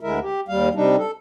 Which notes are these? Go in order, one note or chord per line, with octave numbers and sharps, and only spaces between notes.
D2 D3 G#3 E4 A#4 E5
G4
D#2 G3 F5
C3 G3 D4 D#4
A4